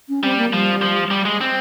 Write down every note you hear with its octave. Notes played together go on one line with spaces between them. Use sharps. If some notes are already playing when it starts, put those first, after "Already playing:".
C#4
G3 C4
A#3
F3 G3
F3
G3
G#3
C4